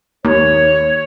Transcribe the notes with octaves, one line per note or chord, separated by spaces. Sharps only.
D#2 C#5